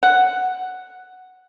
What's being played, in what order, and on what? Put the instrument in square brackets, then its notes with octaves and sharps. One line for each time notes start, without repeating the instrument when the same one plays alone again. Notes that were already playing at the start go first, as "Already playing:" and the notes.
[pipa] F#5